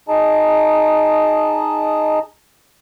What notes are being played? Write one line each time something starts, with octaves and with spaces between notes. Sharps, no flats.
D#4 G#4 D#5 A5 A#5